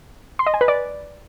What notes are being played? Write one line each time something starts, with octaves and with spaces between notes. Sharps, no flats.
C6
D#5
G#5
B4
D5